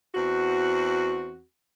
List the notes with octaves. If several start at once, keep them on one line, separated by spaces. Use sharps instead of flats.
E2 C4 F#4